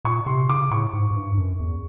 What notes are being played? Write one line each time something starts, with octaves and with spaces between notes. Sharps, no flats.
A#2 C#6
C3 C6
C#3 D6
A2 C#6
G#2
G#2
G2
F#2
E2